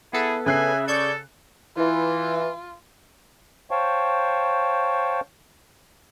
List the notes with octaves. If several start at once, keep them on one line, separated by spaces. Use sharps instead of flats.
B3 E4 G#4 A4 B4
C#3 E5 G#5 F#6 C7
A4 D5 C#6 G6 G#6
E3 F4
C5 C#5 F5 G5 A5 C#6